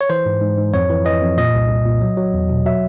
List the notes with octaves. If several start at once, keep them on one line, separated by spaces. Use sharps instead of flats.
C#5
E3 C5
G#2
G#2
G#2
F2 C#5
E3
E3 D#5
F2
A#2 D#5
C2
C2
A#2
F#3
F#3
E2
B2
F#3 E5